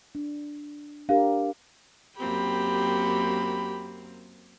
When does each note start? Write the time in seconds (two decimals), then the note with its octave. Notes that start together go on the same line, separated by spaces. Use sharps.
0.15 D4
1.09 D4 G4 A#4 F5
2.19 F#2 A#3 C4 G4 B5